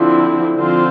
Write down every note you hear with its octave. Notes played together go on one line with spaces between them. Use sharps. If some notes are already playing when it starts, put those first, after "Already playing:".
Already playing: D3 F3 C4 E4
D3 F3 C4 F4 C5